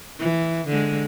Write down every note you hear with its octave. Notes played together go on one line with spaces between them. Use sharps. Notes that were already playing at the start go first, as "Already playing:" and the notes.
E3
D3 G#3